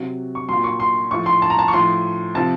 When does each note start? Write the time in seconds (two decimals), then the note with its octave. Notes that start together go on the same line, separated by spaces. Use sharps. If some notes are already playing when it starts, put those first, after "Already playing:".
Already playing: C3 F#3
0.35 C#6
0.49 A#2 F#3 C6
0.64 C#6
0.80 C6
1.11 A2 F3 C#6
1.26 C6
1.42 A5
1.50 A#5
1.59 A5
1.68 C#6
1.73 A2 F3 C6
2.35 C3 F3 A5